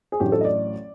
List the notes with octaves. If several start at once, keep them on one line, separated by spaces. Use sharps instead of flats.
G#4
A1 A2 F#3 A3 D4 G4
A4
D#5
D5